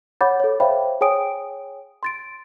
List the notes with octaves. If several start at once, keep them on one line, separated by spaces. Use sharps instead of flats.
C#5 F#5 B5 D6 G6 A6
A4 C#5
C5 C#5 E5 F5 G5 B5
G#4 C#5 G5 G#5 D#6 D7
C6 A6 D7